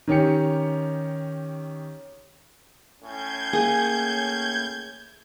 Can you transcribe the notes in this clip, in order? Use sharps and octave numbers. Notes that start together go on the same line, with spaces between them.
D#3 C#4 G4 C#7
A2 C#4 G6 G#6
A#3 G#4